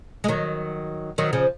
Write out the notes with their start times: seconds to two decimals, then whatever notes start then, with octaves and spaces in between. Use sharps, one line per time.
0.24 G#3
0.28 D#3 F#3
1.18 D#3 F#3
1.33 C#3 F3